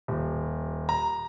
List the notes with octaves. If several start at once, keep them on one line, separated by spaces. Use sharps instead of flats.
D#1
A#5